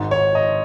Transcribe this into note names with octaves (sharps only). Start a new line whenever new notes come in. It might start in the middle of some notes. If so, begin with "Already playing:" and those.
Already playing: G#1 G#2 D#3
C#5
D#5